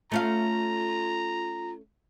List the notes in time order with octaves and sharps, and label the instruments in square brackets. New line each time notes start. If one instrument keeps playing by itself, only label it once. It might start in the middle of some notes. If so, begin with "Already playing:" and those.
[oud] A3 C#4 F5 [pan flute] F4 [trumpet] A#5